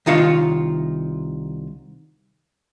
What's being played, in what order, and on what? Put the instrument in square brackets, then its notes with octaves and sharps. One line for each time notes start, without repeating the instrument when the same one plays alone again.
[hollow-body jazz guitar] C2 D#3 F4 C#5 F5